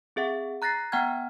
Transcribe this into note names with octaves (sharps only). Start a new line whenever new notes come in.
C4 G#4 E5 F#5
A#5 F#6 A6 A#6 C7
B3 F#5 G5 A#5 F6 G#6